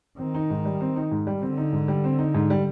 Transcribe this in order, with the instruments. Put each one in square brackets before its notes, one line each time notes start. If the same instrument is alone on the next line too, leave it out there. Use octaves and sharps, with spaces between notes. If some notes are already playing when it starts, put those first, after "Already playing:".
[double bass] D#3 [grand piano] C4
[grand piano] D#4
G#2
G3
C4
D#4
G#2
G3
[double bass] D3 [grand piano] C4
[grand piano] D#4
G#2
G3
C4
D#4
G#2
G3